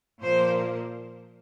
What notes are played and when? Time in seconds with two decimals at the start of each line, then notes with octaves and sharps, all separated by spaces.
0.22 A#2 F3 A#3 C5